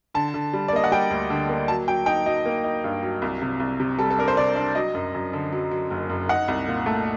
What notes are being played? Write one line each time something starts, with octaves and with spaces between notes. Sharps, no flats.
D3 A5
D3
G3
D5
A#3 D#5
F#5
G3 G5
D2
D3
A#3
F#3 A5
F#3 G5
D#4 G5
F#3 D#5
A#3
D#4
G2
F#3
C2
C3
C2
C3
G3 A4
A4
D4 A#4
C5
C3 D5
D4
F#3 D#5
F#2
F#2
D3
F#3
F#3
F#1
F#2
D#4 F#5
C2
A#2
A3